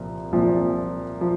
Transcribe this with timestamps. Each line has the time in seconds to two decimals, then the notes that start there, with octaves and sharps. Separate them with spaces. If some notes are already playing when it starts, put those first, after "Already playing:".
Already playing: C2 A#2 F3
0.32 C2 A#2 F3
1.21 F3